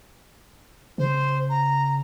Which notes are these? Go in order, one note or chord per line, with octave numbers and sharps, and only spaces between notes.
C#3 C5
A#5